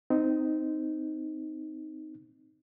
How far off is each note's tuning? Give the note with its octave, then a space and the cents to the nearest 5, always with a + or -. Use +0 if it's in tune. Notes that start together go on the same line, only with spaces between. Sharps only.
C4 -15 D#4 +0